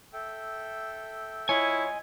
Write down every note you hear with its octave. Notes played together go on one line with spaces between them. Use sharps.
A4 E5 G5
E4 F4 C#5 D#5 G#5